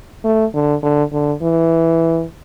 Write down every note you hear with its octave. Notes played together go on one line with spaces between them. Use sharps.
A3
D3
D3
D3
E3